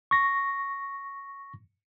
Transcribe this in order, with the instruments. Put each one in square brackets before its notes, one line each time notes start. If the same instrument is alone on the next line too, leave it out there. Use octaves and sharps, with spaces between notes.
[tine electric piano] C#6 A#6